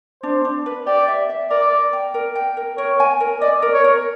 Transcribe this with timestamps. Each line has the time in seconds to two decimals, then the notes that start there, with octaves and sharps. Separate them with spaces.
0.23 D4 C5
0.45 D4
0.66 B4
0.87 G4 D5
1.08 E5
1.29 E5
1.50 A#4 D5
1.72 A#4
1.93 G5
2.14 A#4
2.35 G5
2.57 A#4
2.78 A#4 C#5
3.00 G#5
3.20 A#4
3.41 D5 D#5
3.62 A#4
3.73 C#5
3.84 A#4